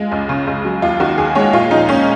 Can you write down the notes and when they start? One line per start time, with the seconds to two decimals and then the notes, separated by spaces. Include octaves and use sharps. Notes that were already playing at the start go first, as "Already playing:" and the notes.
Already playing: G#3 F4
0.12 C#2
0.29 C#3
0.47 C#2
0.65 F#3
0.82 D#2 F4
1.00 D#3 F#4
1.18 D#2 G#4
1.35 G#3 C#5
1.53 A#2 F4
1.71 F3 D#4
1.89 A#2 C#4